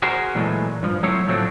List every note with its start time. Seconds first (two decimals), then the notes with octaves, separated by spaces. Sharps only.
0.02 F#4 G#4 A#4 C5
0.35 A#2 E3 F#3 G#3 A3
0.83 G2 F3
1.03 F#3 A3 C4 E4 C5 C#5
1.27 A2 F3 F#3 A3 C4 D4